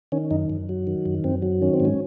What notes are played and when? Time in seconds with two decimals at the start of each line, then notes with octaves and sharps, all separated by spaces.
0.12 D#3 C#4
0.31 F#2 D#4
0.50 F#2
0.69 F#3
0.87 D#3
1.06 F#2
1.24 F#2 C4
1.42 F#3
1.61 D#3 C#4
1.74 C4
1.80 G#2
1.85 C#4